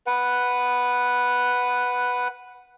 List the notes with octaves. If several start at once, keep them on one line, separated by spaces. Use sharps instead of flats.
B4 F#5